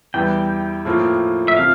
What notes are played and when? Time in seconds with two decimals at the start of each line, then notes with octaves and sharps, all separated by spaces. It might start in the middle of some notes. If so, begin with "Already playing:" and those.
0.14 E2 E3 G3 G5
0.85 A2 F3 A#3 F4
1.48 E5
1.57 C3 F3 F5